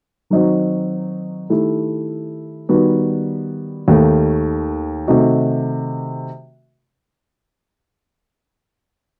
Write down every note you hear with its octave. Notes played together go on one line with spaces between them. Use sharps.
D#3 F#3 C4 D#4 F#4
D#3 A3 E4 G4
D#3 G3 B3 F#4
D#2 D#3 A3
C3 D#3 A3 D#4 F#4